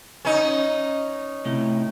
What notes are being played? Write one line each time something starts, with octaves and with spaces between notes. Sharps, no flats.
C#4 D#4
A2 C3 A3